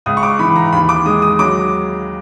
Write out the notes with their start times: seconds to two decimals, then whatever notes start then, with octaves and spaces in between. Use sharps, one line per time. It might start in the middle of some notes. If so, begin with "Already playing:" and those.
0.06 C#2 D#6
0.17 C#6
0.23 D6
0.39 E3 B5
0.56 A#5
0.72 D#2 B5
0.89 D6
1.06 G#3 D#6
1.22 D#6
1.39 F#3 D6